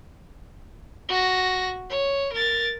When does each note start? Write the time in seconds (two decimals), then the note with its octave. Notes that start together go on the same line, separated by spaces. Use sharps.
1.09 F#4 A#6
1.90 C#5
2.33 A#4 A6